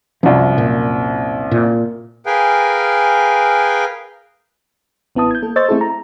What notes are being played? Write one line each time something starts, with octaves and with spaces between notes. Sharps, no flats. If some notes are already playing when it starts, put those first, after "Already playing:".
C2 F#2 F3
A#2
A#2
G#4 A#4 B4 F5 G5 G#5
A1 B3 E4 A5 D#6
G6 G#6
A#3 A4
C5 D#5 C#6 E6 G6 A6
A3 C4 E4 G#4 A4
A#5